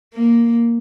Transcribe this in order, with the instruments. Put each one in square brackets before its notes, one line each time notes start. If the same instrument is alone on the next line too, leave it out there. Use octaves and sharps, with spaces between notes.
[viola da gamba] A#3